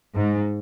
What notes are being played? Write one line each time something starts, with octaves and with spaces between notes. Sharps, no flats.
G#2